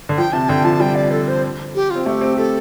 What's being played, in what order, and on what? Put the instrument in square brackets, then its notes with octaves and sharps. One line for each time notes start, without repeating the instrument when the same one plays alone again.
[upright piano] D3
[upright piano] F3 [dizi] G5
[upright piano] C3 [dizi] A5
[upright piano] D3 [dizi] G5
[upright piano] F3 [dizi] A5
[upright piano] G3 [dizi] G5
[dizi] D5
A4
C5
G4
[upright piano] C4 [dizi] F4
[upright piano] A3 [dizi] G4
[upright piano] C4
[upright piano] G4 [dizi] A4